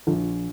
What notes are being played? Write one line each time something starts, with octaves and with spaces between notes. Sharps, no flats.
A#1